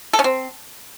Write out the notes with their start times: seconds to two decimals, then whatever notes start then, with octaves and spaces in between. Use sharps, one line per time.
0.13 A4
0.19 C#4
0.24 C4